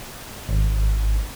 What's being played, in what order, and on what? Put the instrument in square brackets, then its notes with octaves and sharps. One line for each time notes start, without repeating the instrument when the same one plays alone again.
[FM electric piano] G#1